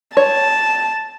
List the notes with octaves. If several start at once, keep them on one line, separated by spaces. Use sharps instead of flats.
C#5 A5